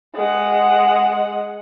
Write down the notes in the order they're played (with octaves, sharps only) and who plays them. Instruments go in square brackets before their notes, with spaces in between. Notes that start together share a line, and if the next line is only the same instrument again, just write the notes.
[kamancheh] G#3 F#5